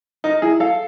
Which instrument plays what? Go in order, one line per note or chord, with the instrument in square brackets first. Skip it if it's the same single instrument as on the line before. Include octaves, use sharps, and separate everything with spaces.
[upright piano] D#4 [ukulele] A#4
[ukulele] E4 [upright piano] G#4
[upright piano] A4 [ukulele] F5